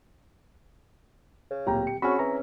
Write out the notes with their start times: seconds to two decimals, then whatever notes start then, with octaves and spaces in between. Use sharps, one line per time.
1.51 C#3
1.67 D1 A#2 G4 G5 A#5
1.87 C#7
2.02 C4 C#4 F#4 G#4 B5 E6
2.19 E3 A#5